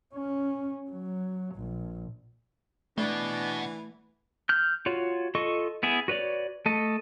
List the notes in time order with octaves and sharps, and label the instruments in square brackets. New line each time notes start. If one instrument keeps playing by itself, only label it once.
[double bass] C#4
F#3
A#1
[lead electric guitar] B2 [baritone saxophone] E3 [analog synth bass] A3 [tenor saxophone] D4
[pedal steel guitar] F6 G6
F4 F#4 C#5
F4 A4 D#5 C#6
B3 E4 G#4
F#4 B4 C#5 D5
A3 A4 D#5